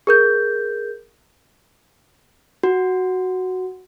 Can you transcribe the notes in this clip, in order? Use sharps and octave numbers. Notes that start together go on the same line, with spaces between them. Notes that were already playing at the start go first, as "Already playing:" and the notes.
G#4 A#4 G6
F#4